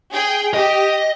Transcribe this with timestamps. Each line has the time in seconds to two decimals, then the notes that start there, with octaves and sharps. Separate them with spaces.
0.13 G#4 G5
0.54 G4 D#5